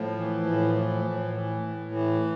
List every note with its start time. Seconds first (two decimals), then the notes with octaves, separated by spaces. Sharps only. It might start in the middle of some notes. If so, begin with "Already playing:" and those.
Already playing: A2 F3
0.17 E3
0.46 A2
0.75 E3
1.05 A2
1.33 E3
1.62 A2
1.92 E3